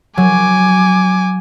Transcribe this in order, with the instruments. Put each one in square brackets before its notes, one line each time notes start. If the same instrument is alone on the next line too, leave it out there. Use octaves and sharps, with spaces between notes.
[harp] F#3 [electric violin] G#5 D6